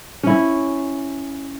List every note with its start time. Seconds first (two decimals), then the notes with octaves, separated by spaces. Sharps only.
0.23 C#4 E4